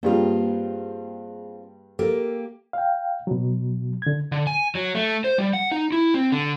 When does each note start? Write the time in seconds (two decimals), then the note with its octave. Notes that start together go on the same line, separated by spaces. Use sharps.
0.03 G2 G3 A#3 C4 F4 G#4
1.99 A#3 G4 A4 A#4
2.73 F5 G5
3.27 B2 F#3
4.02 D3 G#6
4.32 D3
4.47 G#5
4.75 F#3
4.95 A3
5.24 C5
5.38 G3
5.53 F#5
5.72 D#4
5.92 E4
6.14 C4
6.32 D3